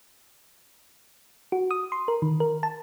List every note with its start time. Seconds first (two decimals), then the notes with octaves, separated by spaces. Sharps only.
1.52 F#4
1.71 D#6
1.92 C6
2.08 A#4
2.22 D#3
2.40 A#4
2.63 A5